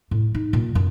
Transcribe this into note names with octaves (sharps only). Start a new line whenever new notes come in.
A2
D#4
A#2
F#2